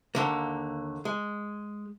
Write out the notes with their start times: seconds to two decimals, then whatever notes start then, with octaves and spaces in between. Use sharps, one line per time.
0.15 D#2 D3 A#3
1.05 G#3